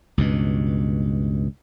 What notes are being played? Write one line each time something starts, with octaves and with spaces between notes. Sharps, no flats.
C#2 G2 B2